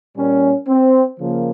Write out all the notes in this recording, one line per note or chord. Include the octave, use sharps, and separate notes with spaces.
A#2 G3 A#3 C#4
C4
C#3 F3 A#3